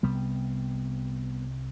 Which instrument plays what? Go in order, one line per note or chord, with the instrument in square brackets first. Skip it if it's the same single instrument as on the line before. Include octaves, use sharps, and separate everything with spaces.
[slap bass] C2 C3 G3 B3